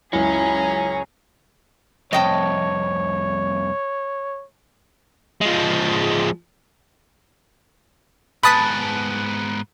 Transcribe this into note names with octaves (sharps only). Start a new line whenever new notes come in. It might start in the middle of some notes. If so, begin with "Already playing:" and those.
C#2 F#2 E4 G#4 C#5 G#5 A#5
C2 F2 C#5 D#5 G5 A5
F3 G#3
G#2 B3 B4 A5 B5 D#6 B6